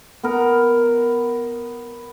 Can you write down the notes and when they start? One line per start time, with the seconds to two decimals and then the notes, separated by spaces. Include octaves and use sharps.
0.24 B3 A#4